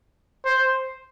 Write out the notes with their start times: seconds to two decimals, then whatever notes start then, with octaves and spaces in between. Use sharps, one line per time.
0.45 C5